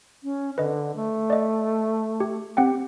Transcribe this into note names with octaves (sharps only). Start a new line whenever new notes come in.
C#4
D3 B4 D#5
A3
D5 D#5
G4
C4 G4 F#5 G5